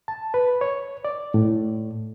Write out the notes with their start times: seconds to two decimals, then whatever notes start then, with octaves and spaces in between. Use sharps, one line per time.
0.08 A5
0.34 B4
0.61 C#5
1.05 D5
1.34 A2